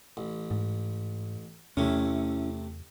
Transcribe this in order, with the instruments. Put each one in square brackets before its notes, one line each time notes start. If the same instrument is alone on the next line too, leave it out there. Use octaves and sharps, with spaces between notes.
[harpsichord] A1
[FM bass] G#2
[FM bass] E2 [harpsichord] C3 A3 [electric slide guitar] C#4 E4